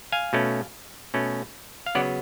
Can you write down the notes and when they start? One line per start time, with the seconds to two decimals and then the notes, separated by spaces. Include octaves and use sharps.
0.12 F5 G#5
0.33 B2 A3 C#4
1.14 B2 A3 C#4
1.86 F5
1.95 C#3 F#3 B3 D5 F#5